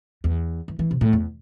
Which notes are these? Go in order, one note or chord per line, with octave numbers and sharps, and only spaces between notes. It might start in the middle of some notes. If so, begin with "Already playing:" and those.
E2
E3
E3
C3
A2
E2